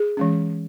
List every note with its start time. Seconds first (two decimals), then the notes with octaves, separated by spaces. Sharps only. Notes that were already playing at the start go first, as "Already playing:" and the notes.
Already playing: G#4
0.17 E3 G#3 C#4